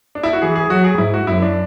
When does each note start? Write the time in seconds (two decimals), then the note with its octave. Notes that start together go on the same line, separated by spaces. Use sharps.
0.15 D4
0.23 E4
0.33 F#4
0.41 E3 G#4
0.56 G#4
0.69 F#3 F#4
0.84 G#4
0.98 G#2 E4
1.14 F#4
1.27 F#2 E4
1.42 D4